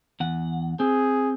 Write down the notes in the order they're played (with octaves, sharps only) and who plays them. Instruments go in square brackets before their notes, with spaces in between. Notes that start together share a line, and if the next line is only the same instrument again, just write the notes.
[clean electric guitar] E2 F#5
[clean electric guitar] C4 [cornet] G#4